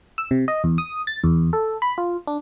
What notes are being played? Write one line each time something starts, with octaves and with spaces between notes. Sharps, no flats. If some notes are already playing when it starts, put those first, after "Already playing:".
E6
C3
D#5
E2
D#6
A6
E2
A4
B5
F4
D4